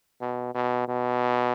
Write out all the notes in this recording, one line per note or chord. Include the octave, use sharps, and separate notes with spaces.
B2
B2
B2